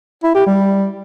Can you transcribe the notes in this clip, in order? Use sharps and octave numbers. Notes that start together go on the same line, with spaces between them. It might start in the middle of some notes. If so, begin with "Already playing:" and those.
E4
G4
G3